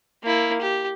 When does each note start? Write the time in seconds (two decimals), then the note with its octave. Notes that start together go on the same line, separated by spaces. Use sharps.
0.23 A#3 E4
0.61 G4